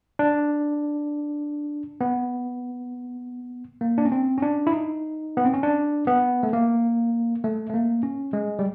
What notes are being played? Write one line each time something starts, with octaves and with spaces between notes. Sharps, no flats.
D4
B3
A#3
D4
C#4
C4
C#4
D4
E4
D#4
B3
C4
C#4
D4
B3
A3
A#3
A3
A3
A#3
C#4
G#3
G3